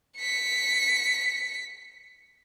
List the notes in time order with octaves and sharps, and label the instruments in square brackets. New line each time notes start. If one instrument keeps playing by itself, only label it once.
[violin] B6 C#7